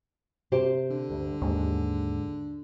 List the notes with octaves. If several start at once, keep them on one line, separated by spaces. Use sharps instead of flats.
C3 G4 C5
D3
D2 G2
D#2 G#2 G#3